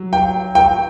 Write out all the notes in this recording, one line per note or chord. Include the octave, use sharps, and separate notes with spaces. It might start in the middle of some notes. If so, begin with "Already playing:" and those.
Already playing: F#3
G5
G5